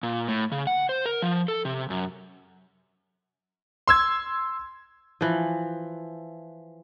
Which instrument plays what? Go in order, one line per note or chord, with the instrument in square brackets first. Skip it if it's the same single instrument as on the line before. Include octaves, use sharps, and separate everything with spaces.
[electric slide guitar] A#2
A2
C#3
F#5
C5
A#4
F3
A4
C3
F#2
[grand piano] C6 E6 G#6
[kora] E3 F3